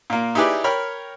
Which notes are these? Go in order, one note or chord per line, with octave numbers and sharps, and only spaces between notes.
A#2 A#3
D#4 E4 G4 G#4 B4 D5
A#4 C#5 G5 B5 F6